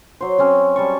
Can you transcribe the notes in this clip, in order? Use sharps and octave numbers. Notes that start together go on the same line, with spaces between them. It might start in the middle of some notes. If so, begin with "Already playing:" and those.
F#3 C5
F#3 C4 C#4
G3 A5 C#6